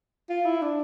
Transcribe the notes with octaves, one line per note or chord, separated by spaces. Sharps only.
F4
E4
D4